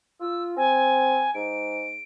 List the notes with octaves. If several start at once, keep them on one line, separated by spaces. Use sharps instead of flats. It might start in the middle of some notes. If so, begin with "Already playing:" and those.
F4 E6
C4 G#5
G#2 D7